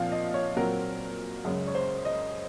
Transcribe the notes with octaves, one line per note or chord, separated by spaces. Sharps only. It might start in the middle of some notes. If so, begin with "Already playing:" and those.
Already playing: A#2 F3 C4 F5
D#5
C#5
A#2 F#3 C4 A#4
F#2 C#3 G#3
C#5
C5
D#5